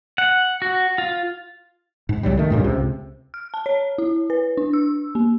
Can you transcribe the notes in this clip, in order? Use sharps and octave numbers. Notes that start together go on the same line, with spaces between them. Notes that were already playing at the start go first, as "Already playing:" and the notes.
F#5
F#4
F4
G#2
C2 F#2 F#3 G3
D#3 A3
G2 A#2 C#3 G3
C#2 C3
F6
A5
C#5
E4
B4
D4
E6
A#3